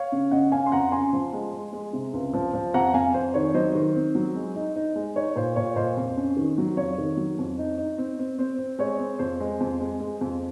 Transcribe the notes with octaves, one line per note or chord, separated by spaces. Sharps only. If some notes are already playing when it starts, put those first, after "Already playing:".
Already playing: C#5 F5
C#3
C#3 D#5 F#5
C#4 F5 G#5
C6
F2 F#5 A#5
C#3 G#5 C6
F3
G#3
G#3
G#3
C3
C#2
F3
F3
F2 F#5 A#5
F2 F5 G#5
F2 C5
D#3 C#5
F#3 C5 D#5
D#3
C4
F#3
G#3
D#4
D#4
G#3
D#4 C#5
A#2 C5
A#2 C#5
A#2 C5 D#5
F2
C#4
D#3
F#3
F2 C#5
D#3
F#3
F2
D#4
D#4
C4
C4
C4 C5
C4
G#3 C#5
C4
F2 C5
G#3
F2
G#3
G#3
F2